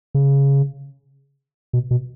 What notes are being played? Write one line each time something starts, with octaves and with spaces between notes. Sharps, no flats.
C#3
B2
B2